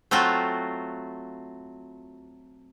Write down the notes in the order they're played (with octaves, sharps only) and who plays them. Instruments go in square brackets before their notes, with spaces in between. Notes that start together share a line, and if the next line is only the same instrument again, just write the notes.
[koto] F#3 A3 C4 F4 F#4